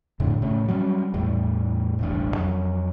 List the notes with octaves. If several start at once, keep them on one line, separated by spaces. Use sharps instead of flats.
F2 A2 D3
A2 C#3 A3
F#3 G3 B3 C#4
E2 A2 G3
E1 A1 G2
F2 F#3